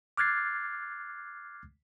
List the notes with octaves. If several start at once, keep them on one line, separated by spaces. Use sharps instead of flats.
D6 F6 F#6 G#6 A6 C7